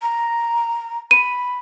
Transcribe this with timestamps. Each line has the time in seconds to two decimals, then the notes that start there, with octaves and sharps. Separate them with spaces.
0.02 A#5
1.11 B5 D#7